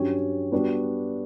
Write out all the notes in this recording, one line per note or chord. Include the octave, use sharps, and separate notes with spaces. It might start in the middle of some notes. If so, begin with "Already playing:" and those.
Already playing: G2 F#3 C#4 G4 C#5
G3 B3 D4 F#4